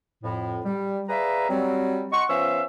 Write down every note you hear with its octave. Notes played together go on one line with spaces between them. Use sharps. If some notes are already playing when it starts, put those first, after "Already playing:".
F2 A2
G3
G#4 B4 D5 E5 F5 A#5
F#3 G3 C4
D#5 F#5 C6 C#6
F3 B3 C#4 E5 F5 E6